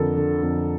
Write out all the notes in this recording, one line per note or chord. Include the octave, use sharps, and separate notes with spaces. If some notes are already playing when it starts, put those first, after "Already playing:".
Already playing: F2 D3 A4 A#4
D3
F2